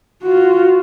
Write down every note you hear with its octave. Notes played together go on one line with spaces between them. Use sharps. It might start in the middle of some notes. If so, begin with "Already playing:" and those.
F4 F#4